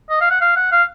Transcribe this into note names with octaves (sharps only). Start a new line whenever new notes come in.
D#5
F5
F#5
F5
F#5
F5